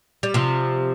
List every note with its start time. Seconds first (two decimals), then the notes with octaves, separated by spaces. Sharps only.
0.23 G3
0.34 C3 F3